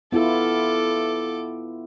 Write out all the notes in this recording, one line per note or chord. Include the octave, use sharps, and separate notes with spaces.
B3 E4 F4 A4 D6